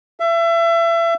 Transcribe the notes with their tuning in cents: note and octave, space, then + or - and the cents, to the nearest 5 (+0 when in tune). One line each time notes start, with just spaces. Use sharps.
E5 +30